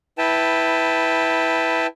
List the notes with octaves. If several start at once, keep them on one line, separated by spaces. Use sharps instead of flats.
E4 B4 G5 A5